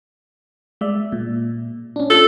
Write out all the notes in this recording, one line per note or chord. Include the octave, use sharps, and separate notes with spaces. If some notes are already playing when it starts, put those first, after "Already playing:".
G#3 D5 E5
A#2
C#4 D4
F4 A4